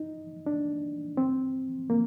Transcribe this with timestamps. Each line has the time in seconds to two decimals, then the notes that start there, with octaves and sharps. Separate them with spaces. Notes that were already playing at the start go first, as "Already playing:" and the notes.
Already playing: D#4
0.46 D4
1.17 C4
1.90 A#3